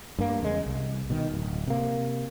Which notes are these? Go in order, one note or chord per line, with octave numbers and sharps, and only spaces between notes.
G2 A#3
E2 C#3 G#3
C2
B2 D#3
D1
C3 A#3